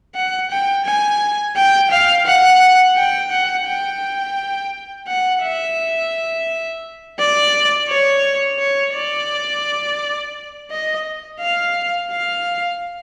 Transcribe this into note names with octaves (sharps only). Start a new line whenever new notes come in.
F#5
G5
G#5
G5
F5
F#5
G5
F#5
G5
F#5
E5
D5
C#5
C#5
D5
D#5
F5
F5